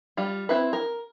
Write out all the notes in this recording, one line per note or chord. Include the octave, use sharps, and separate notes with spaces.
G3 F4
C4 E4 B4
A#4